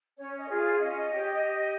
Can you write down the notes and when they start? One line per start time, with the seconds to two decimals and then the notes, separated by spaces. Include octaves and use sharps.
0.17 C#4 C#5
0.38 D#5
0.48 F4 G#4
0.59 F5
0.79 C#4 D#5
1.11 G4 C#5
1.41 G4